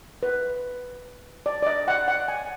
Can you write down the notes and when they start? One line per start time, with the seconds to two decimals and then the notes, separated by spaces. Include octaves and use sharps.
0.23 B4
1.46 D5
1.63 D5
1.67 D#5
1.88 F#5
2.08 F#5
2.28 G#5